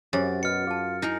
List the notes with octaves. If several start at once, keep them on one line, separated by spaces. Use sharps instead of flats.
F#2 C3 G#4 C#5 G#5 A6
B2 F6 C#7
F4 G#4 A5
D#4 E4 G#4 A#4